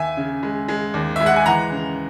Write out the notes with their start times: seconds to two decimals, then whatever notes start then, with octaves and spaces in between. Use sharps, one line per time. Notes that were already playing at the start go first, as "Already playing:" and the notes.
Already playing: D#2 E5 G#5
0.17 C#3
0.43 G#3
0.68 G#3
0.94 D#2
1.16 G#3 E5
1.26 F#5
1.36 G#5
1.46 E3 F#5 A#5
1.72 C#3